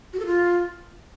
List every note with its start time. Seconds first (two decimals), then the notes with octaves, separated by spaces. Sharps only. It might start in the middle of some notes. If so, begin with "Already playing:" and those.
0.13 F#4
0.20 A4
0.26 F4